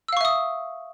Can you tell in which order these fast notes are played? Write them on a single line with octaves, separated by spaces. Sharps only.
E6 F5 C#6 E5 D#6